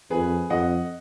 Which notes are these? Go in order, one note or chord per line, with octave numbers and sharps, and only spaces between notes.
F2 G#4 B4
F2 D#5 F#5